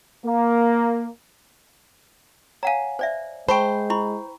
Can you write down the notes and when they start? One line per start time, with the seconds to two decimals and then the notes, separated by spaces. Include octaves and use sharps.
0.25 A#3
2.63 C#5 F5 F#5 G#5 A#5
2.99 C5 D5 E5
3.49 G#3 C5 G5 A5 B5 C#6
3.90 E4 A#5 B5 C#6